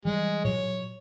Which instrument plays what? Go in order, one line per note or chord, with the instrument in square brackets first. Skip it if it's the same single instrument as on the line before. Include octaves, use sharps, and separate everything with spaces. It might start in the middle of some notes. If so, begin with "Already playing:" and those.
[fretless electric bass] E3 G3 [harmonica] G#3
[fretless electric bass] A#2 F#3 [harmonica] C#5